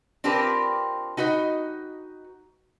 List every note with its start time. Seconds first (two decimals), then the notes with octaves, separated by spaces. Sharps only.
0.24 C4 D4 F4 G4 A#4 B4
1.17 D#4 F#4 B4 D#5